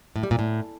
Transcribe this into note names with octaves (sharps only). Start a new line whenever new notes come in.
A2
G3
A#2
A2